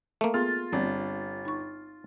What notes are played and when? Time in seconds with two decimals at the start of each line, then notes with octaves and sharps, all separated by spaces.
0.21 A3 A#3
0.34 B3 F4 G#4
0.73 G1 C4 D5
1.45 D#4 C#6